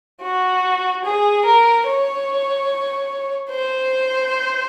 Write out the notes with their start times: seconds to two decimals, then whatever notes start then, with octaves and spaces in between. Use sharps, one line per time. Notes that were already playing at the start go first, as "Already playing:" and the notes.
0.22 F#4
1.04 G#4
1.45 A#4
1.87 C#5
3.51 C5